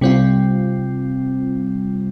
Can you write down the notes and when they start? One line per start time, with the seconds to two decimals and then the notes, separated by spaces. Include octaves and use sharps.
0.01 C3 G3 C4 F4